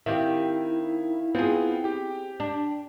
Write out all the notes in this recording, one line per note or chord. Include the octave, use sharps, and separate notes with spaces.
D#3 C4 E4 G4 E5 F5
B3 C4 F4 G#4
G4 G5
D4